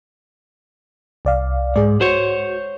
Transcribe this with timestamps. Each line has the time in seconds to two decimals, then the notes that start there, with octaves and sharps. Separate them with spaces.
1.25 C2 D5 F5
1.76 G#2 G#4 D5
2.01 F#4 C5 C#5